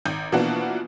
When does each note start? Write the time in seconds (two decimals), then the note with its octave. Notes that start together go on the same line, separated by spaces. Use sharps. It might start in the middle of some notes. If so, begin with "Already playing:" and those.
0.05 G#1 G6
0.32 B2 E3 F3 A#3 D4 F#4